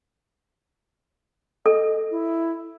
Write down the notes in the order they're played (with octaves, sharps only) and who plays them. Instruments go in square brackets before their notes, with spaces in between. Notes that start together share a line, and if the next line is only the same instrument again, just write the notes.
[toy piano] A4 [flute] D#5
[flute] E4